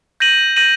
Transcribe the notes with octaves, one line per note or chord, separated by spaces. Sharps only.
G6 A#6 D#7 F#7
G6 A#6 D#7 F#7